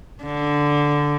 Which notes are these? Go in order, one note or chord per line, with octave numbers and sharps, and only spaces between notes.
D3